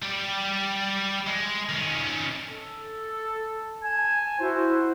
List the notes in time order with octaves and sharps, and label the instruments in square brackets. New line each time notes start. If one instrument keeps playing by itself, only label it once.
[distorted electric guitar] G3 G4
G#3
D#3 C#4
[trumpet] A4
[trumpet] G#5 [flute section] A5 G#6
[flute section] E4 F#4 [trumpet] C5